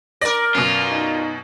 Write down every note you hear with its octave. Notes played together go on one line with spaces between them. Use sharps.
A#4 D5 A#6
F#2 B2 F4
D#4